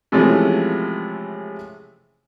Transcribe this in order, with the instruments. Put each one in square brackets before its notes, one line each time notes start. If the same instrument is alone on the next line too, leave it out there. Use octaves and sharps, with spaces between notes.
[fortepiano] C3 E3 F3 G#3 A3 C#4